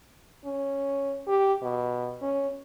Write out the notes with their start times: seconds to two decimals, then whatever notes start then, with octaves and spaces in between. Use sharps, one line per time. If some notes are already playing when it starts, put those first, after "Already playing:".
0.45 C#4
1.27 G4
1.63 B2
2.22 C#4